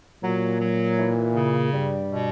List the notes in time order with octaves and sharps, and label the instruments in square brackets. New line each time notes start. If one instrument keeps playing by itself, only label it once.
[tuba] A#2 [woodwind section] F#3
[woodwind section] F#3
E3
C#3
[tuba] G2 [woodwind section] G3
[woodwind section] B2